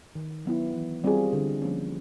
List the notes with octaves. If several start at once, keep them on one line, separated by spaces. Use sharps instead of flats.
D#3
F#3 B3 E4
E3
G3 C4 F4 G#4
D3
F3 A#3 C#4